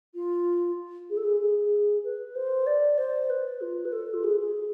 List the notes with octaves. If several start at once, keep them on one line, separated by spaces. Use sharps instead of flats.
F4
G#4
A4
G#4
G#4
B4
C5
D5
C5
B4
F4
B4
A4
F4
G#4
G#4